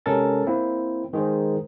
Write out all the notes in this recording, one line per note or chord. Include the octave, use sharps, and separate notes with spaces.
C3 G#3 C#4 A4 A#4 A6
A#3 C4 E4
D#3 G#3 G#4 A#4 C5